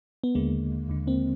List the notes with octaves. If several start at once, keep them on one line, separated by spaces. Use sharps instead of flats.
B3
D#2 D3 G#3 A#3
D#2 D3
A#3 C4